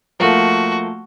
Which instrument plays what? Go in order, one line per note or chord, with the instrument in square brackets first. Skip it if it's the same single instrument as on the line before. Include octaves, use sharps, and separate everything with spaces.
[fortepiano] F3 A3 A#3 [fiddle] F#4